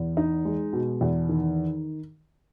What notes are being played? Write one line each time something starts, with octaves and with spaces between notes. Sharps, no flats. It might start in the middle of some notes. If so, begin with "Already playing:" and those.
Already playing: E2
D#4
G#3
B2
E2
D#3